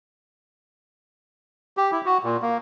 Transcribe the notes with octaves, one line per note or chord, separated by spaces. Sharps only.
G4
E4
F#4
A#2
A#3